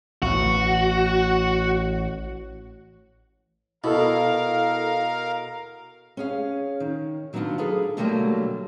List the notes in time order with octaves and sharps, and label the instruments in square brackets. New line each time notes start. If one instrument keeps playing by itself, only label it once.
[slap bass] A1 [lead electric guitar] F#4
[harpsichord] B2 [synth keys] E4 A4 [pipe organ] A#4 F5
[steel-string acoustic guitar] C#4 G#4 F5
D#3
D#3 F#3 A#3 B3 D4 F4
G#4 A4 B4 F5
B2 D3 F#3 G3 A3 A#3